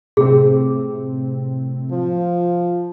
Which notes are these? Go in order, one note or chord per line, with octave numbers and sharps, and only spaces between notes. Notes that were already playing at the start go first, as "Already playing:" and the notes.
A2 C3 C4 G#4
F3